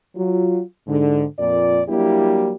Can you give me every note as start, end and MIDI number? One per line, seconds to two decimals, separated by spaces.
0.16 0.60 54
0.16 0.60 65
0.87 1.24 44
0.87 1.24 50
1.38 1.81 41
1.38 1.81 46
1.38 1.81 74
1.87 2.53 54
1.87 2.53 55
1.87 2.53 58
1.87 2.53 62
1.87 2.53 64
1.87 2.53 67